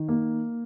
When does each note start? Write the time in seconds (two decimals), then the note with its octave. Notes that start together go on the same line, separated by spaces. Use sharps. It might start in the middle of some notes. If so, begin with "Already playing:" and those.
Already playing: D#3
0.09 A#3